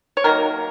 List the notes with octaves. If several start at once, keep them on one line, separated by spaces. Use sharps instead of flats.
C#5
D#3 F#3 A#3 A#4